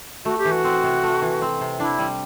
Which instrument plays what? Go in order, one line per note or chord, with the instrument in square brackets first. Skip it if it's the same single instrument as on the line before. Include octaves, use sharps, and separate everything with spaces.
[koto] A3 [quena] F#4
[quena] G4
[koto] E3
[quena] F#4
[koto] C4
C3
A3
E3
C4
C3
[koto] D4 [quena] E4
[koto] G3